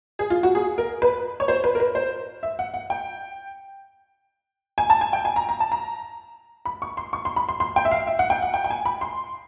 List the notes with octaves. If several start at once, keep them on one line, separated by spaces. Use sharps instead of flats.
G#4
F4
F#4
G#4
A#4
B4
C#5
C5
B4
A#4
B4
C5
E5
F#5
F#5
G5
G#5
A5
G#5
G5
G#5
A#5
A#5
A5
A#5
B5
C#6
C6
C#6
C6
B5
C6
C6
G5
E5
F5
E5
F#5
G5
F#5
G5
G5
G#5
B5
C6